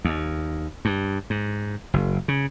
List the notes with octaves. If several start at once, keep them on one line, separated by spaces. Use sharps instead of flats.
D#2
G2
G#2
F#1
C#3